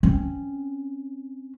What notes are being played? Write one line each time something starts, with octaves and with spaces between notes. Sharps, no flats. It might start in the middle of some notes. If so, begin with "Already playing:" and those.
C4 C#4